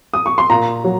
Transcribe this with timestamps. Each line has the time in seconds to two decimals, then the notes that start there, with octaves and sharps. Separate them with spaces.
0.14 D#6
0.26 C#6
0.38 C6
0.50 A#2 A#5
0.84 F#3